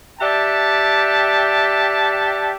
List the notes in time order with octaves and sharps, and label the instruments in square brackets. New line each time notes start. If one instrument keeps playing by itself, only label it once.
[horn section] G4 D5 E5 F#5 G5 A5